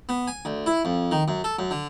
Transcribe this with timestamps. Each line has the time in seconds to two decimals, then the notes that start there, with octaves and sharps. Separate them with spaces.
0.09 B3
0.28 G#5
0.45 D2
0.66 E4
0.85 F2
1.11 D#3
1.28 F#2
1.44 A4
1.59 F#2
1.71 D3